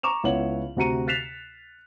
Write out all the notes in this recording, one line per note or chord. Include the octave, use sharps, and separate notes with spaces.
A#5 C#6 D6 E7 F7
C#2 B3 E4 C#5 F#5 F#7
D2 C3 F#4 A#5 C#7 D#7
F#6 A6 B6 C7 E7 F7